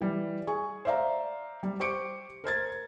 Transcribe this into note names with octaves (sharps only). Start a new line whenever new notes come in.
E3 G3
G#4 G#5 C#6
C5 D5 E5 F5 A#5
G3
G4 C5 C#6 D6 C#7 D7
A#4 C5 G#6 A6